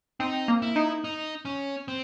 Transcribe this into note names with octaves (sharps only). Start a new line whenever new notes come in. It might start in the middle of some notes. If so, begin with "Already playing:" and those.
C4 D#4
A#3
E4
D#4
D#4
C#4
C4